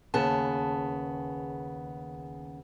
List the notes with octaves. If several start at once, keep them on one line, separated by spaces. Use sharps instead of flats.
D#2 C#3 B3 G#4 A5